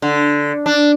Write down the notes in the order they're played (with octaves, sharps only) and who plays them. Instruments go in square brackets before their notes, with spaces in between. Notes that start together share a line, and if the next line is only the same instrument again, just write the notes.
[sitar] D3
D4